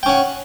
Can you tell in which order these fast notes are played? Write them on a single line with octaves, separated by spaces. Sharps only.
G5 C#4 F#5